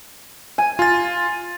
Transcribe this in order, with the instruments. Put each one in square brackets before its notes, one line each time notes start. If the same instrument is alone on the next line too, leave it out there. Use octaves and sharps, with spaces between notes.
[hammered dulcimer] G#5
[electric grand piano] F4 A6